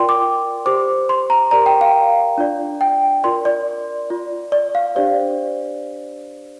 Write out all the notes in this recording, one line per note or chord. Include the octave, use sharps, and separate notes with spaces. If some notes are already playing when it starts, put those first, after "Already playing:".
Already playing: F4 A#4 D5 G5 C6
D6
G4 C5 D6
C6
A#5
G4 A#4 D5 A#5
G5
F5
D4 F4 D5
G5
F4 A#4 D5 C6
D5
F4 D5
D5
F5
D4 G4 C5 D5